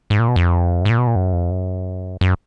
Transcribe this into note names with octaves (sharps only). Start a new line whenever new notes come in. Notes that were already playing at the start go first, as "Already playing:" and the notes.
G#2
A#2
B2
F2
F#2
G#2
A#2
B2
A#2
F#2
F2
F#2
F#2